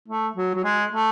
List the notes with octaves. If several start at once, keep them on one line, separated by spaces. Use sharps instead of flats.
A3
F#3
F#3
G#3
A3